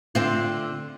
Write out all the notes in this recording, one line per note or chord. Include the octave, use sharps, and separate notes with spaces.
D3 C4 F4